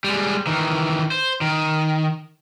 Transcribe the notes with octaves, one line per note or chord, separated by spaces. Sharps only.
G3 G#3
D#3 E3
C5
D#3